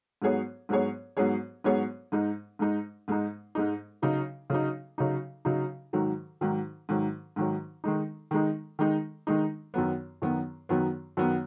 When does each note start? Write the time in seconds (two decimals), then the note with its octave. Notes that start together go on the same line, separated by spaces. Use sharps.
0.22 G#2 F#3 B3 G#4 C#5
0.69 G#2 F#3 B3 G#4 C#5
1.17 G#2 F#3 B3 G#4 C#5
1.64 G#2 F#3 B3 G#4 C#5
2.12 G#2 G#3 D#4
2.59 G#2 G#3 D#4
3.08 G#2 G#3 D#4
3.55 G#2 G#3 D#4
4.02 C#3 F#3 D#4
4.50 C#3 F#3 D#4
4.98 C#3 F#3 D#4
5.45 C#3 F#3 D#4
5.93 G#2 D#3 F#3
6.41 G#2 D#3 F#3
6.89 G#2 D#3 F#3
7.36 G#2 D#3 F#3
7.84 D#3 G#3 D#4
8.31 D#3 G#3 D#4
8.79 D#3 G#3 D#4
9.27 D#3 G#3 D#4
9.74 F#2 D#3 F#3 B3
10.22 F#2 D#3 F#3 B3
10.69 F#2 D#3 F#3 B3
11.17 F#2 D#3 F#3 B3